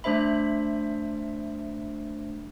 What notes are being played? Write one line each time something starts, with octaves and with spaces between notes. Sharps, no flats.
A3 D4 C5 E5 B5